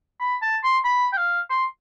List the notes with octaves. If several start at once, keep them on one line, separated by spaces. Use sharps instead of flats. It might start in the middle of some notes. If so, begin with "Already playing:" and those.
B5
A5
C6
B5
G5
F5
C6